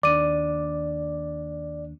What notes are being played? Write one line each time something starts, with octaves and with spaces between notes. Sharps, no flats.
D#2 D4 D5 D6 D#7